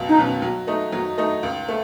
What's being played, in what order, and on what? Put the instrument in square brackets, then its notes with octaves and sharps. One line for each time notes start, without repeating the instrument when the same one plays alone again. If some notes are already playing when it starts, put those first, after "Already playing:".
Already playing: [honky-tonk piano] C#2 B2 F#3
[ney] D#4
[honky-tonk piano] B2 F#3 C#4
F#3
A3 D#4
F#3
A3 D#4
C#2
A3